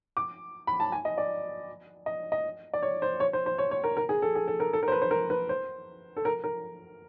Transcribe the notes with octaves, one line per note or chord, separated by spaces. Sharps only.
D6
B5
A5
G#5
D#5
D5
D#5
D#5
D5
C#5
C5
C#5
C5
C5
C#5
C#5
A#4
A#4
G#4
A4
G#4
A4
A#4
A4
A#4
C5
B4
C5
A#4
B4
C5
A4
A#4
A#4